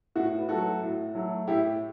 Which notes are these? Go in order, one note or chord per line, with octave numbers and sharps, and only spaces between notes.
A2 F#4
B4
F#3 A3 F#4 A4
A2
F#3 A3
A2 E4 G4